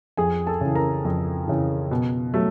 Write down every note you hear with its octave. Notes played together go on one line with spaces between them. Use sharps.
F2 G#4 G#5
A4 A5
C#3 E3
A#4 A#5
F2
C#3 E3
B2
F#3 A3